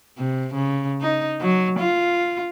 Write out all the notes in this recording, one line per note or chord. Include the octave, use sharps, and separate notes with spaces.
C3
C#3
D#4
F#3
F4